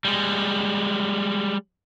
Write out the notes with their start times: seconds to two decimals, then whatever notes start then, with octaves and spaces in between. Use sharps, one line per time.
0.05 G3 G#3